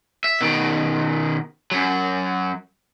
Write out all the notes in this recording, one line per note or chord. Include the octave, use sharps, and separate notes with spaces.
E5
B2 D#3
F#2 F#3